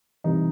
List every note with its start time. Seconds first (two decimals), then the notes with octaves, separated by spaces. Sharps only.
0.24 C3 E3 G3 D#4